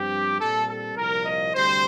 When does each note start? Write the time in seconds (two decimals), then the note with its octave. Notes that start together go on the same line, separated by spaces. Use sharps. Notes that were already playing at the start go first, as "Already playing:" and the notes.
Already playing: G2 F3 C4 G4
0.39 A#2 G3 C4 A4
0.68 A4
0.96 C2 A#2 F3 A#3 A#4
1.25 D#5
1.52 D2 C3 G3 C5